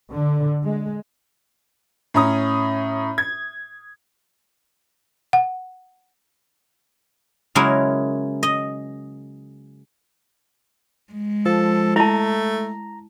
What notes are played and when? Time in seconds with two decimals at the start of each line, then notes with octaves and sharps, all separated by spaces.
0.12 D3
0.64 G#3
2.14 A2 C#4 A#5 D#6
3.18 G#6
5.33 F#5
7.55 C#3 F#3 G#3 E4 A#4
8.43 D#5
11.13 G#3
11.46 F3 A4
11.96 A3 E4 A5 A#5